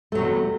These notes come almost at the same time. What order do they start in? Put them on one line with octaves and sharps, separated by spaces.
A3 F#3 C3 E2